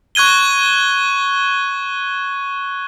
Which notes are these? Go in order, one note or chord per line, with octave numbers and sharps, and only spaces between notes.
C#6 F#6 G#6 D#7 G7